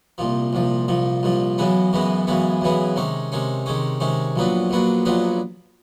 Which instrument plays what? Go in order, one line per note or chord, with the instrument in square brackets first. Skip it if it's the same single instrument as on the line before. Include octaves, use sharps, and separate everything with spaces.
[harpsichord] C2 A#2 F3
C2 A#2 F3
C2 A#2 F3
C2 A#2 F3
F#2 C#3 E3 G#3 B3
F#2 C#3 E3 G#3 B3
F#2 C#3 E3 G#3 B3
F#2 C#3 E3 G#3 B3
C3 D#3 G#3 C#4
C3 D#3 G#3 C#4
C3 D#3 G#3 C#4
C3 D#3 G#3 C#4
A#1 A#2 F#3 B3 D4
A#1 A#2 F#3 B3 D4
A#1 A#2 F#3 B3 D4